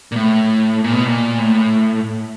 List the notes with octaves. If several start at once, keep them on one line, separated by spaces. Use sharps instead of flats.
A#2
A2
A#2
B2
A#2
A2